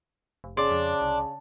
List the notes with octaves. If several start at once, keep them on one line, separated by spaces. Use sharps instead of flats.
F1
G1 C#3 D4 C6 D6
F2
C2